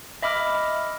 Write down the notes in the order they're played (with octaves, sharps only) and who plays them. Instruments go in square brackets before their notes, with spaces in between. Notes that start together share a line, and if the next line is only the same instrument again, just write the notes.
[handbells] D#5 E5 B5 D6 F6